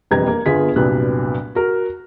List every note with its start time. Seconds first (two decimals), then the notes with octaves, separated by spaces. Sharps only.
0.11 E1 F2 G3 B4 A#5 G#6
0.27 A#3
0.46 G1 B3 F4 G#4 G#5 B6
0.76 C2 G2 A#2 F#3 B3 F#6
1.55 F#4 A#4